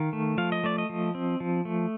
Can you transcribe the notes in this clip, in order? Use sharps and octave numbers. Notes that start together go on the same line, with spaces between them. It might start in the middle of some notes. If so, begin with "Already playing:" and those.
Already playing: D#3 F5
A3
F3 F5
D#5
A3 D5
D#5
F3
C4
F3
A3